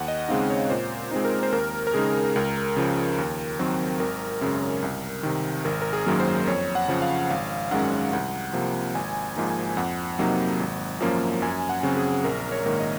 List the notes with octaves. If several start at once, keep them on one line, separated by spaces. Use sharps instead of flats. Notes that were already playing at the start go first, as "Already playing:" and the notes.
Already playing: D#2 F#5
D#5
C#3 G#3 C4 D#4 F5
C#5
A#2 C5
G#3 C4 D#4
A#4
C5
D#2 A#4
A#4
C#3 G#3 D#4 G#4
C#2 A#4
C#3 F3
D#2
D#3 F#3 C4
G#1 A#4
F#2 C#3 G#3 C#4
C2
C3 D#3
G#1 A#4
A#4
G#4
F#2 D#3 F#3 A#3
C5
F2 C#5
F#5
C#3 F3
F5
G#1 F5
F#2 D#3 G#3 C#4 F#5
C2 F#5
C3 F3 A#3
G#1 G#5
G#5
G#2 F3 A#3 D#4
G#5
F2 F#5
C3 F#3 A#3 D#4
G#1
F#2 F3 A#3 C#4
F#2 G#5
F#5
C#3 F#3 C4
G#4
A#1 A#4
C#5
G#2 D#3 A#3
D#5